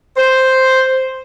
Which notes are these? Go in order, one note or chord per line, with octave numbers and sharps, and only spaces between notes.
C5